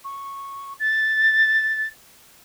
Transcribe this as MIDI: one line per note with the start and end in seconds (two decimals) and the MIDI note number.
0.04 0.73 85
0.79 1.87 93